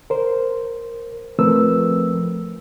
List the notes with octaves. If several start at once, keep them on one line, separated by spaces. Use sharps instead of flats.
A#4 C5
F3 A3 C4 A#4 B4 E6